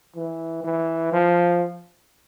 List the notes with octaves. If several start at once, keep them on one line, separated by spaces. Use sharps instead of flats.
E3
E3
F3